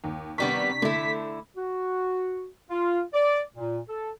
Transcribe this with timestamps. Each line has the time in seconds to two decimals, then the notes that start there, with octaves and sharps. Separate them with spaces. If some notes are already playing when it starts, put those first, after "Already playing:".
0.04 D#2
0.38 C3 D#3 G3 B3 D4 C#6 B6
0.82 D3 A3 E4
1.57 F#4
2.70 F4
3.13 D5
3.55 A#2
3.89 A4